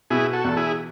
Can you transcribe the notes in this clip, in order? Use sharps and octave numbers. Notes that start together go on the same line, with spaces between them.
B2 E4 G#4
F#4 A4
E2 A4
E4 G#4